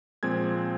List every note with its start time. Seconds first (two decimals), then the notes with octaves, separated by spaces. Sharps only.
0.23 A#2 F3 G#3 C4 G#6